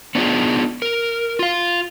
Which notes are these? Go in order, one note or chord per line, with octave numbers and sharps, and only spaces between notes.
B3 D4 D#4 F4 G4 G#4
A#4
F4 F5